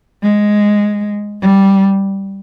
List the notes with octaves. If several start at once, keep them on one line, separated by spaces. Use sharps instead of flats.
G#3
G3